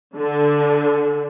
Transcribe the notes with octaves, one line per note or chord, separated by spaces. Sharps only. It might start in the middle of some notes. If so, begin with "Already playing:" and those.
D3